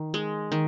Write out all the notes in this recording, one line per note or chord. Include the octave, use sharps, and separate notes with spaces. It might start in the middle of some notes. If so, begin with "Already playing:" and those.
Already playing: D#3
G#3
D#3